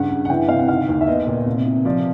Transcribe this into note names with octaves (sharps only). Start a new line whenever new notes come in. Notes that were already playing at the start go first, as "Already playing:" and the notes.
Already playing: G2 C#3 F#5
G2
F#5
E3 G5
C3 F5
F#5
D#3 F5
D#2
E5
B3 D#5
A#2
C3
C3
F3 D5